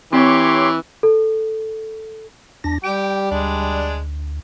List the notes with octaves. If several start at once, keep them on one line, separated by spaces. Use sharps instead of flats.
E3 C4 G4 C#5 C6 D6
A4
E2 D4 A#6
G3 G4 G5
D2 G#3 D4